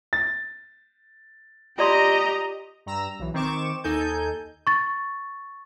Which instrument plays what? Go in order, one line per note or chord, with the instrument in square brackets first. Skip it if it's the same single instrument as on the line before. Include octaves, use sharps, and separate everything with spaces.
[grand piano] A6
[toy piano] F4 D5 C6 [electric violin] G4 A#5 [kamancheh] D#5
[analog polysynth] G2 A#5 E6
B1 E3
D#3 C4 C#6 D6 E7
D#2 D#4 A4 G#5 G6
[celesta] C#6 A6